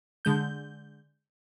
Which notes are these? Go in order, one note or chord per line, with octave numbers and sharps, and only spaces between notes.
D3 G#3 G6